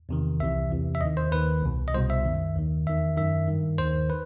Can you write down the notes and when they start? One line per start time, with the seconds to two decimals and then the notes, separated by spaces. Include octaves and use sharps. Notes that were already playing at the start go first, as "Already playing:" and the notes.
0.09 E2 C3 D#3
0.40 C2 C3 E3 E5
0.71 E2 C3 E3
0.95 E5
1.01 D#2 D#3 D#5
1.17 C5
1.32 D#2 D#3 B4
1.62 C2 B2
1.88 D#5
1.94 C2 B2 C5
2.10 E5
2.25 F#2 D#3
2.56 D#2 D#3
2.87 E2 D#3 E5
3.17 F#2 D#3 E5
3.47 G2 D#3
3.78 D#2 D#3 C5
4.10 B4